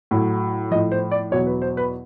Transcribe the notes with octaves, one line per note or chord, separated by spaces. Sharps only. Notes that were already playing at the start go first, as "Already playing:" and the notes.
A2 F#3
A2 F3 D#5
C5
D5
E2 B2 F#3 C#5
B4
C5
B4